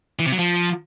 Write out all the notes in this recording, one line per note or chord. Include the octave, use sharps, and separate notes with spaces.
E3
C3
F#3
F3